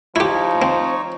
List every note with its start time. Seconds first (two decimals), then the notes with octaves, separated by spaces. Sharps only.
0.16 F3 D#4 E4 G4 C#5
0.62 C4